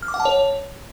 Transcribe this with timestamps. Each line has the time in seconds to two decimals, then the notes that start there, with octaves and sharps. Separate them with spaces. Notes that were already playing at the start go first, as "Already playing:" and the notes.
0.02 F6
0.08 D6
0.14 F#5
0.20 A5
0.25 C#5